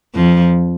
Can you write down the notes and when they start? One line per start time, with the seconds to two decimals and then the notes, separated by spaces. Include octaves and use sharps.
0.15 F2 F3